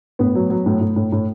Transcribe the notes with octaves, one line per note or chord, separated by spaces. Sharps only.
A2 B3
F#3
F#3
A2
A2
A2
A2